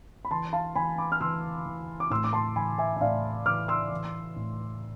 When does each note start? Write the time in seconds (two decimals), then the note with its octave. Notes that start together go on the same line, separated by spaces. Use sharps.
0.25 B5
0.31 E3 A5 C6
0.53 F5 A5
0.75 E3 G#5 B5
0.98 B5 D6
1.12 F6
1.20 E3 C6 E6
1.66 E3
2.00 D6
2.10 A2 C6 E6
2.24 D6
2.33 A5 C6
2.56 E3 G#5 B5
2.78 E5 G#5
2.97 E5
3.01 A2 D5 F5
3.46 E3 D6 F6
3.68 C6 E6
3.91 E3
4.36 A2